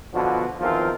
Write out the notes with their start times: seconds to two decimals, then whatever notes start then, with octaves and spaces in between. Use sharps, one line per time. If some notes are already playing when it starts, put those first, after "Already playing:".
0.13 B2 D3 F3 B3 F#4
0.59 E2 D#3 F3 C4 F4 A#4